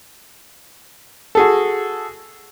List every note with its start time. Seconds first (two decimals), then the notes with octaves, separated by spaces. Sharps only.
1.35 F#4 G#4 A4